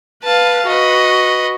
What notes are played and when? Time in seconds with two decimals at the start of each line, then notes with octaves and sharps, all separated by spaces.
0.23 B4 F5 A5
0.67 F#4 B4 D#5